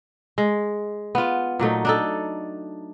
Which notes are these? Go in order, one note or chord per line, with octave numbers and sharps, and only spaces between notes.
G#3
B3 F4
A#2 F#3 A3 D#4
D4 D#4 A4